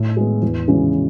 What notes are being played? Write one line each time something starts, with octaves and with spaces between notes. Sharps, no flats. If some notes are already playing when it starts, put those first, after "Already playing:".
Already playing: A2
G#3 B3
E2
C#3 E3 G#3 C#4